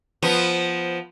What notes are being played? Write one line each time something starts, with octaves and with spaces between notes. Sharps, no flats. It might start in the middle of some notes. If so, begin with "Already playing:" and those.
F3 B3